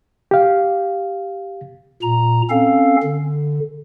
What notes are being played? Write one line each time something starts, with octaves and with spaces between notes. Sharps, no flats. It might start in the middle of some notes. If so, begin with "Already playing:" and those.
G4 F5
A#2 A#5
C4 C#4 A4 F5
D3